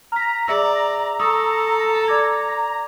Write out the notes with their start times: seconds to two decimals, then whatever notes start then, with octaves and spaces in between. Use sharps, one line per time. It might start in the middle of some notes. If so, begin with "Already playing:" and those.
0.12 A#5 F6 B6
0.48 G#4 D5 E5 E6
1.20 A4 C#6 D#6 E6
2.08 D5 D6 G#6